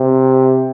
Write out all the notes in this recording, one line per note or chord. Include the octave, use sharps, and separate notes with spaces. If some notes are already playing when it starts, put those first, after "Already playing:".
Already playing: C3